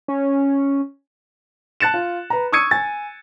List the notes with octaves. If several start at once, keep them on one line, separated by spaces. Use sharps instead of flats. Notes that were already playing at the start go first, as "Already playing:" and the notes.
C#4
A5 F#6 A6 C#7 E7
F4
B4 A#5
C#6 D#6 E6 G#6 C#7 D#7
G#5 A6